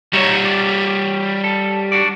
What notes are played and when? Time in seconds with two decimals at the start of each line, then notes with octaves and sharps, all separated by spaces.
0.13 G3 D#4 F#4 C#5 E5
0.45 D5
1.44 A4
1.92 D4 F#4 D5